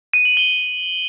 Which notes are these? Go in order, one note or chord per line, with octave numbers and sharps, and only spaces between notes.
D#7
F#7
G7